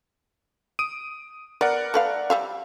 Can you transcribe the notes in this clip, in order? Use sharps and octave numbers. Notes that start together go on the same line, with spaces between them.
D#6 D7 D#7
B3 A#4 D5 F#5
A3 B4 F5
G3 E5 F5